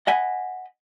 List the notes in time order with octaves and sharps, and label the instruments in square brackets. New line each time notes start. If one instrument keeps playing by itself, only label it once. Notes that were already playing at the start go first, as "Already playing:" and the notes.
[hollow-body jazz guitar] D#5 F#5 G#5 B5